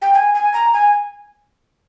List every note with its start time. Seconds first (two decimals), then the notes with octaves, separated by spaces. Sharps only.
0.02 G5
0.14 G#5
0.34 G#5
0.54 A#5
0.73 G#5